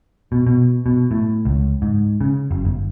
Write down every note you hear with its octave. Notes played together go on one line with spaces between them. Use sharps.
B2
B2
B2
A2
C#2
G#2
C#3
F#1
G1